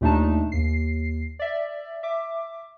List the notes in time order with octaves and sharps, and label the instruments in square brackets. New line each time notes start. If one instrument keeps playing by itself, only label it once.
[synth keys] D#2 A#2 A3 D4 D#4 A5
D#2 C7
D5 E5
E5 D6